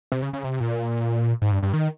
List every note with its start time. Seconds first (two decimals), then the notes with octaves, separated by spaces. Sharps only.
0.12 C3
0.22 C#3
0.33 C#3
0.44 C3
0.60 A#2
1.42 G#2
1.52 G2
1.63 G2
1.73 D#3